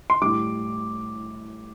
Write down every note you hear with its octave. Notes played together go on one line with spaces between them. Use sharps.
C6
A2 G3 D6